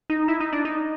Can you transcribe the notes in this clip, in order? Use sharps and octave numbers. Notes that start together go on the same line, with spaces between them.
D#4
E4
D#4
D4
D#4